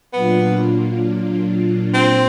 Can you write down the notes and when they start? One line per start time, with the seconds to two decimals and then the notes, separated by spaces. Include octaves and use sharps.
0.13 A#2 F#3 A#3 B3 D4 F4
1.94 C4